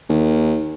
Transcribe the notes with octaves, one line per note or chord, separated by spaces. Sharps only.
D#2